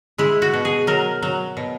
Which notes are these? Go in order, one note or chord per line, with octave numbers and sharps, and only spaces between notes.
G#3 E4
F#4
B2
G#4
F#3 A#4
F#3
B2